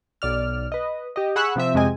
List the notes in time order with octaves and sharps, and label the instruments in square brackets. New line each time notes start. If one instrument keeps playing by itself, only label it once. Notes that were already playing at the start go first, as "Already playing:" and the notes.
[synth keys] B1 D5 F6
B4 D#5
G4 D#5
G#4 F#5 B5 C#6 E6 F#6
C3 F3 C4 E5
F2 C3 G#3 C4 D#5 G#5